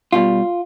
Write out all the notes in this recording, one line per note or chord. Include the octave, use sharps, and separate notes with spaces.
B2 G3 F4